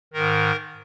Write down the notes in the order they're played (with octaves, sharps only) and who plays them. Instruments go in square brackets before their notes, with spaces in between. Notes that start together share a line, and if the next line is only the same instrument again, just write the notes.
[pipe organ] G#2 D#3 A#4